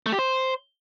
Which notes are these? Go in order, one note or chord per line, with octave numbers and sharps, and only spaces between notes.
A3
G4
C5